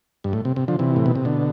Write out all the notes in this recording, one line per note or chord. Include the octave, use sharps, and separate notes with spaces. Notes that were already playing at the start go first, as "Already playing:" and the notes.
G2
A2
C3
C3
D3 F3
C3 E3
A2
B2
C3
B2 D3